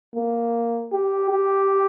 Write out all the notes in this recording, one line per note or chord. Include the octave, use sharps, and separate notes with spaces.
A#3
G4
G4